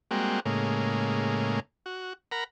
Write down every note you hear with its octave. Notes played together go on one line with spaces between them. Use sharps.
G3 G#3 A#3 C4 F#4
A2 C#3 G#3 A#3
F#4
A#4 F#5 A#5 B5